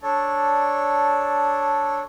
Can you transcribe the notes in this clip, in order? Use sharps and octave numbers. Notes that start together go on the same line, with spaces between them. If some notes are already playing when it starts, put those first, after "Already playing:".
D4 A4 C#5 D5